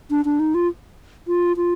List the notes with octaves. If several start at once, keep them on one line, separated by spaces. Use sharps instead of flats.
D4
D4
D#4
F4
F4
F4